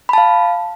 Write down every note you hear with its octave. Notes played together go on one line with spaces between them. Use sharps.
F5 A5 B5